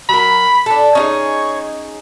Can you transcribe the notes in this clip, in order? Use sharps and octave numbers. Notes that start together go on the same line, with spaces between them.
F#3 A#4 B5
D4 A4
C#4 D#4 G#4 C#5